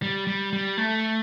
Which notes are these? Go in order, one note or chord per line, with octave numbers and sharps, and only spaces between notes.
G3
G3
G3
A3